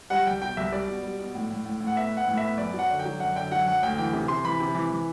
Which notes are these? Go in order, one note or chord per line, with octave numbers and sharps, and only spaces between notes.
G3 F#5
C2 G5
B2 G5
C2 E5
G3 D5
B2
G3
B2
A2
A2
A2
A2
F#5
B3 E5
B3
F#5
A2
E5
B3
F#2 D5
F#3 F#5
D3
G5
F#3
F#2 F#5
D3 G5
F#3 F#5
F#2 F#5
D2 G5
E3 G5
C3
C3 C6
E3 B5
C3
E3
E3